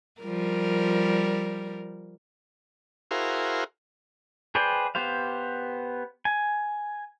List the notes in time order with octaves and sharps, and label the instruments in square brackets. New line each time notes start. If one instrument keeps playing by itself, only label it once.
[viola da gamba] F3 G3 A#4
[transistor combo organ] E4 F#4 G#4 A#4 C5 F5
[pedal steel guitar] G#4 B4 C5 D5 G5
B3 G4 C5 F5
G#5